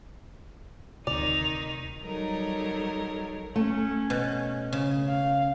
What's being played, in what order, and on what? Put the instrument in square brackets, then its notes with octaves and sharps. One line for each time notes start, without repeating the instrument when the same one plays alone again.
[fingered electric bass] D2 C3 [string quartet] D#3 D#4 [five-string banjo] D5 [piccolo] F7
[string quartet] F#3 G3 D#4 A4 A#4 C#5
[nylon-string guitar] A3 [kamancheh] C#4
[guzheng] B2
C#3
[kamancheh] F5